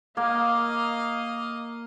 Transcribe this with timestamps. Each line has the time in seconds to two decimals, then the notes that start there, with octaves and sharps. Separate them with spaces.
0.17 A#3 D#5 F5